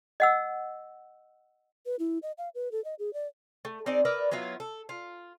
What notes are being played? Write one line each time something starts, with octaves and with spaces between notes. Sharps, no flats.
D#5 F#5 E6
B4
E4
D#5
F5
B4
A4
D#5
G#4
D5
A3
C4 D#4 G#4 D5
A#4 B4 D5 E5
F#3 B3 E4 F4
A4
F4